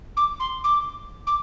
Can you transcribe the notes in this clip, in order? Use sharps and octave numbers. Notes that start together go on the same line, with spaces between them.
D6
C6
D6
D6